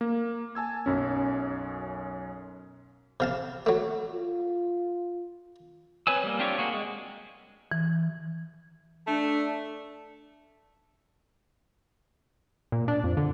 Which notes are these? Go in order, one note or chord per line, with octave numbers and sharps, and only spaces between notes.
A#3
G#5 A5 E6 G#6
B1 F#2 C#4
C3 F5 A5
F#3 A3
F4
C4 B4 C#5 G#5 E6
G3 A#3
C4 D4 F4 G4 C#5
A#3 F#4 G#4
G#3
E3
A3 D4
A#2
D4
F2
D3